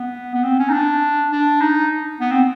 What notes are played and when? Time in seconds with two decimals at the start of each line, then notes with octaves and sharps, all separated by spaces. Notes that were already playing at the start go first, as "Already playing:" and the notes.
Already playing: B3
0.34 B3
0.44 C4
0.59 C#4
0.69 D#4
0.73 D4
1.32 D4
1.61 D#4
2.20 B3
2.31 C4